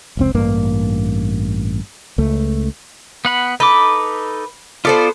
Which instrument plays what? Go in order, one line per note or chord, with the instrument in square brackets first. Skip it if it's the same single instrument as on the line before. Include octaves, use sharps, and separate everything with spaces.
[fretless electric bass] F1 C#2 C4
A1 G2 A#3
C#2 A3
[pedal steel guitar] B3 F#5 B5
[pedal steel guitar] D#4 A4 D6 [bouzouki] B4
[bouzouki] B3 A4 C5 [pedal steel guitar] F4 D5